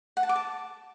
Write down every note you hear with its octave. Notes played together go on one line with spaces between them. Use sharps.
F#5
A5
D6
A5